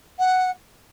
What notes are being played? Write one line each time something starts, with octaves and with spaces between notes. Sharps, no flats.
F#5